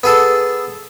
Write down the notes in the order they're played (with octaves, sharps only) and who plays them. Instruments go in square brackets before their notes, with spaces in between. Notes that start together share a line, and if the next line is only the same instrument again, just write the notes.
[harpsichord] B3 G#4 A4